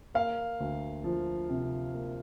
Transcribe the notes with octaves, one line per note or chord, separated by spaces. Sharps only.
A#3 F5
D2
F3
C3
A#3